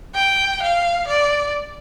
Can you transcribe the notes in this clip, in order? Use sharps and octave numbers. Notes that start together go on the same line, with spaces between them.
G5
F5
D5